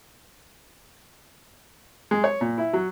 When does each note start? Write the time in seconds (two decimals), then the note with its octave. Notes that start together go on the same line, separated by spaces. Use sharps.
2.11 G#3
2.24 C#5
2.41 A#2
2.58 E4
2.73 F#3